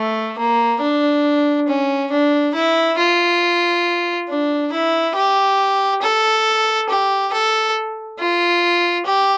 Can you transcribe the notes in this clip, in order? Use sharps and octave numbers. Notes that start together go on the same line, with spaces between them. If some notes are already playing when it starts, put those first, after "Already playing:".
Already playing: A3
A#3
D4
C#4
D4
E4
F4
D4
E4
G4
A4
G4
A4
F4
G4